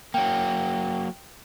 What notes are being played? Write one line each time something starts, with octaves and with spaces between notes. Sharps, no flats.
F#3 A#3 G5